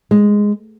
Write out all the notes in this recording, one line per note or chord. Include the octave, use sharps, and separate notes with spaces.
G#3